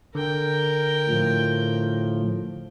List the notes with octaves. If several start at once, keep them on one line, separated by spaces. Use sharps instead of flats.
D3 A#4 G5
A2 F3